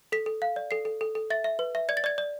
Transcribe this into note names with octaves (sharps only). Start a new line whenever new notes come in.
A4 B6
A4
F5
D5
A4 C7
A4
A4
A4
E5 A6
E5
B4
E5
D5 G#6
A6
D5 G#6
D5